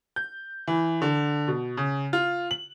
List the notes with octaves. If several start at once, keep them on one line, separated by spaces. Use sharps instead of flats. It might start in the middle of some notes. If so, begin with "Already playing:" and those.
G6
E3
D3
B2
C#3
F4
F#7